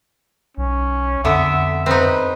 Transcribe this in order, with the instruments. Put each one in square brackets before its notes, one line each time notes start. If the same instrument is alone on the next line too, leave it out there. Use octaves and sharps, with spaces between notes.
[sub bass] B1 [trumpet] C#4
[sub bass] F2 [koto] D3 B3 [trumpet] E5
[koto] C4 D#4 [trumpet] B4